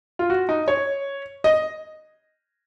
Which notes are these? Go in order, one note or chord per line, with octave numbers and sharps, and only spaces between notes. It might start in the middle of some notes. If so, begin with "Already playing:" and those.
F4
F#4
D#4
C#5
D#5